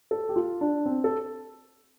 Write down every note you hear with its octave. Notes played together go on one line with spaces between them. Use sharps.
A4
G4
F4
D4
C4
A4